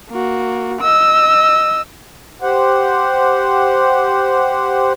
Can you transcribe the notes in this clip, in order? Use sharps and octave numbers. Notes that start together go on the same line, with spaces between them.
A#3 F#4
D#5 E6
G4 C5 F#5